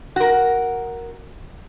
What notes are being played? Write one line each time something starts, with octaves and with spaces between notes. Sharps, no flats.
F#4 A#4